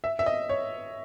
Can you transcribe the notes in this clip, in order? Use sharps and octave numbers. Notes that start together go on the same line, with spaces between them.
E5
E5
D#5
C#5